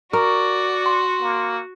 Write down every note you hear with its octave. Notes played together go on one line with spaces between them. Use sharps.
F#4 A#4 D5 C#6
C6
A#3